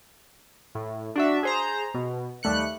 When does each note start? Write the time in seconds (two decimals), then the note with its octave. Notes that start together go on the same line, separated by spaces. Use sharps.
0.75 A2
1.16 D4 F#4 E5
1.43 G#4 C5 A#5
1.94 B2
2.43 D#2 G3 A3 F#6 C#7